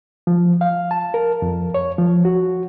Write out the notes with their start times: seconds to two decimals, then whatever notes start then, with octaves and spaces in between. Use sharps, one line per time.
0.27 F3
0.61 F5
0.91 A5
1.14 A#4
1.42 F2
1.74 C#5
1.98 F3
2.25 F#4